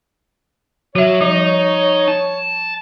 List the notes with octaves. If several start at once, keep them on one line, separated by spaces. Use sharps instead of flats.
F#3 F#4 C#5 E5
F3 G3 D#4
A5